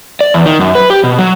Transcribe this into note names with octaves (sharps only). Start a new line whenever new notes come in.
D5
E2
D#3
F#2
B4
G4
B2
F#3